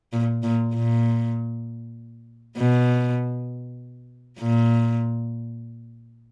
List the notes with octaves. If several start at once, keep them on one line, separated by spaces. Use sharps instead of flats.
A#2
A#2
A#2
B2
A#2